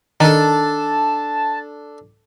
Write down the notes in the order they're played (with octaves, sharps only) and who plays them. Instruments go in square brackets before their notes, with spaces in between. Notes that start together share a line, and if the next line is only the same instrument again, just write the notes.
[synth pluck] D#3 [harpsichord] D4 A4 [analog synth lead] A5